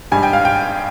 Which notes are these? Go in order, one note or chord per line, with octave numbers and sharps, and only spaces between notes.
G#1 G2 G3 G#5
G5
F5
G5